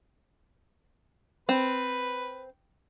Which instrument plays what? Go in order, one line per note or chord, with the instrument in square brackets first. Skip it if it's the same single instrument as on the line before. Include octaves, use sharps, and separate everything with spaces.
[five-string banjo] C4 [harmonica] B4